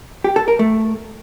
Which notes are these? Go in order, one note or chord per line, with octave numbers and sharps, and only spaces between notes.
G4
A4
A#4
A3